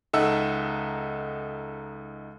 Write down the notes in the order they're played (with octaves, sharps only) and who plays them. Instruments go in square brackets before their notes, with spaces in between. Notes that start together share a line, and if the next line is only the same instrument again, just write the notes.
[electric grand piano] C#2 D#4 A4 E5 F#5 E6